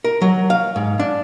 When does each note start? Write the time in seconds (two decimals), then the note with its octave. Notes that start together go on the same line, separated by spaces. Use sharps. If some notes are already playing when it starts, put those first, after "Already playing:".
0.04 A#4
0.22 F#3
0.50 F5
0.76 G#2
0.99 D4